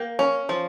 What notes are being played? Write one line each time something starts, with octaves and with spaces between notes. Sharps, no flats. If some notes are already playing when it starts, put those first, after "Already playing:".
Already playing: A#3 G5
C#4
F3